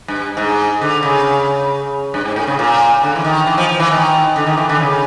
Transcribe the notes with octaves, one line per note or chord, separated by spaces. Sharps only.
G2
G#2
D3
C#3
G2
G#2
A2
C#3
A#2
D3
E3
D#3
E3
F3
F3
E3
D#3
D3
D#3
E3
D3
C#3